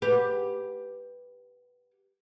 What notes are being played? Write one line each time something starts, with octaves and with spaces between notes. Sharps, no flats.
G4 B4